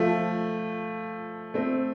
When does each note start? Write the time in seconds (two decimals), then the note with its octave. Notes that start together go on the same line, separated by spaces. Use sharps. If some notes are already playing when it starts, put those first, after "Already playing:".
Already playing: F3 A3
1.54 A3 C4